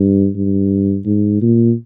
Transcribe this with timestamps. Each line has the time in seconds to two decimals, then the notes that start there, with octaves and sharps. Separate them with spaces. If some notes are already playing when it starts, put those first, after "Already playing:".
Already playing: G2
0.36 G2
1.05 G#2
1.42 A#2